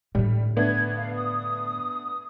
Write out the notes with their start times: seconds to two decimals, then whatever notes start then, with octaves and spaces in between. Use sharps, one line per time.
0.15 A2 D3 G3
0.57 A3 B3 D4 G#6
0.96 F5
1.15 D#6